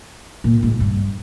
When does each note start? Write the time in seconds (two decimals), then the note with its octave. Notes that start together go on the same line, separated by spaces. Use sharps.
0.44 A#2
0.63 G#2
0.80 G2